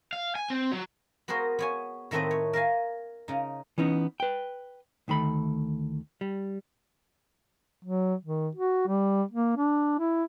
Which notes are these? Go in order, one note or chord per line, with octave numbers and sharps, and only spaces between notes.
F5
G#5
C4
F#3
B3 F#4 G#4 A#4 C5
B3 C#5 G#5
A2 D#3 A3 C4 B4 D#5
C#5
A#4 E5 F5 G#5
C#3 D#4
E3 B3 C#4 D#4
B4 G5
D2 D#3 A3 B5
G3
F#3
D#3
F#4
G3
A#3
D4
E4